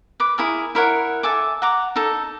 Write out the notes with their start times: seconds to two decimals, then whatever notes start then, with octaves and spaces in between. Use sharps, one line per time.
0.20 B4 D6
0.38 E4 G#4 A#4
0.75 E4 A#4 C#5 F#5
1.23 A4 E5 G#5 D6
1.62 F#5 A#5 D6
1.96 D#4 A4